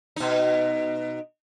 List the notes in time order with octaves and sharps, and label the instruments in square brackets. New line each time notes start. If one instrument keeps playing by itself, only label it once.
[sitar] B2 D#4